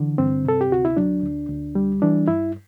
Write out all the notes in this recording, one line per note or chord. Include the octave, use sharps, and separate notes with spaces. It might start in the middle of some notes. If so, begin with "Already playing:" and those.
Already playing: D3 E3
G2 C4
C3 A4
G4
D2 F#4
E4
F#3 D4
D2
D2
G3
E3 D4
G2 E4